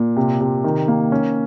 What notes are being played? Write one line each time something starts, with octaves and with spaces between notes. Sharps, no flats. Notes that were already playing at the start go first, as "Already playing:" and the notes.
Already playing: A#2
C3
C3
D#3
A#3
C#4